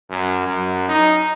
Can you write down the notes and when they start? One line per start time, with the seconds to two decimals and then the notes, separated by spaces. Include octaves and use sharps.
0.10 F#2
0.46 F#2
0.88 D#4